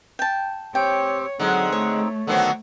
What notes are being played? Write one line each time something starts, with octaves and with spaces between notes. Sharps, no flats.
G5 A5
C4 G4 C#5 G5
D3 F#3 G#3 C4 D#4
A3 C#5
D3 D#3 F#3 B3 C4 A4